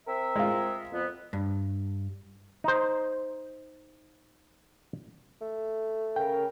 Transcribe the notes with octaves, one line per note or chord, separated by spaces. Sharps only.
C4 A#4 E5
G#3 F4
F2 B3
G2
D#4 C5
A3
C#3 A#4 G5